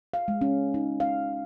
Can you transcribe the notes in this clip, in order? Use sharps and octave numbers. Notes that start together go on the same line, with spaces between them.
F5
G#3
C#4
D#4
F5